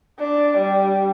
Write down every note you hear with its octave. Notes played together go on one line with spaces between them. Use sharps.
D4
G3